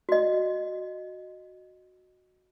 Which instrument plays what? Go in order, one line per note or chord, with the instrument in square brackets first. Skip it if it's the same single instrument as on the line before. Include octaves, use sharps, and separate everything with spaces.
[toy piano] F#4 D#5